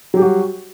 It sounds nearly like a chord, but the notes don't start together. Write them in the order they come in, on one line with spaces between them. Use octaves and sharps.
F#3 G4 G3 F#4